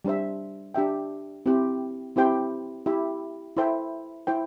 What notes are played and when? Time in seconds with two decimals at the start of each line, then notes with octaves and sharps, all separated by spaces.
0.05 G3 D4 C5 E5
0.74 D4 G4 E5 G5
1.46 C4 E4 G4
2.16 C4 E4 G4 C5 G5
2.86 E4 G4 E5
3.57 E4 A4 C5 E5 G5
4.27 E4 C5 G5